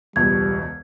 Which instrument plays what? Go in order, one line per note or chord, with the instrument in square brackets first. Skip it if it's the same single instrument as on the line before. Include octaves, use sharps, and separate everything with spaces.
[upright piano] E1 C#2 B2 [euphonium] G3 [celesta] G#6